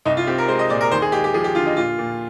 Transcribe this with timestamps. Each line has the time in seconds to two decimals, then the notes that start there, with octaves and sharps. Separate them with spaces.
0.05 C2 D#4
0.17 F4
0.27 C4 G4
0.38 A#4
0.48 G#3 C5
0.59 D#5
0.70 A#2 D5
0.81 A#4
0.91 D#2 C5
1.02 G#4
1.12 G#3 G4
1.24 G4
1.34 F3 G#4
1.44 G4
1.55 D3 F4
1.66 D#4
1.77 A#2 F4
1.99 A#2